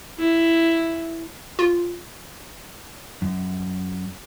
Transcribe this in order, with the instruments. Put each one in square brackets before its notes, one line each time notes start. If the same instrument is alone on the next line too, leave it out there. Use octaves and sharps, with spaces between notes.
[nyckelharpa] E4
[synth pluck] F4
[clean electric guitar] F#2